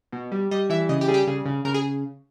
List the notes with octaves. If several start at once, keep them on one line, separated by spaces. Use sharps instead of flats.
B2
G3
G3 D#5
E3 E5
C#3 D#5
G4
G3 G#4
G4
C#3 G#4
C#3
C#3 A#4
G#4